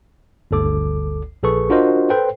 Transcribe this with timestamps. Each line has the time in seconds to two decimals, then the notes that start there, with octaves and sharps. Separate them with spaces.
0.51 G1 D2 A4 D6
1.43 A#1 G#4 A4 B4 C#6
1.70 D4 F4 F#4 A#4 C5 D#5
2.10 A4 B4 C5 G5